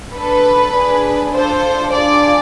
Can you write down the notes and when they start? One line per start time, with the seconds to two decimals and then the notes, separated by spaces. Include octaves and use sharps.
0.15 D4 A4 B4
0.74 D4 G#4
1.34 D4 F4 A4 C5
1.92 D4 F4 G#4 D5